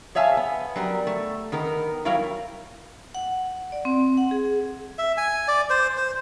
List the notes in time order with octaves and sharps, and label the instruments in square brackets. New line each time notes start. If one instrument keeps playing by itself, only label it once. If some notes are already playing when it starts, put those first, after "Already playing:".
[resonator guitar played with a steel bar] G#4 C#5 E5 F5 G#5 A5
B3
F#3 G3 A#4
A3
D#3 B3 A#4
F#3 G3 E4 A#4 C#5 F5
[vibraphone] F#5
D5
C4
F#5
G#4
[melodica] E5
G#5
D5
C5
C5